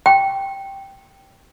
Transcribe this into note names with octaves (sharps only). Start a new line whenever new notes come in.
G5